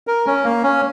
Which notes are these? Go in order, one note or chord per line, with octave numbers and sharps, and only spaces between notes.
A#4
C#4
A#3
C#4